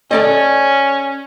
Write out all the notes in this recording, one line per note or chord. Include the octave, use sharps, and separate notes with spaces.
C#4 A4 D5 D#5